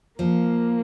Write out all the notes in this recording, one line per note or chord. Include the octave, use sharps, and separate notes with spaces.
F3 A#3